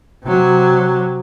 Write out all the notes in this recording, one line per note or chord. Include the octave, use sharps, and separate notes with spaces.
C3 F#3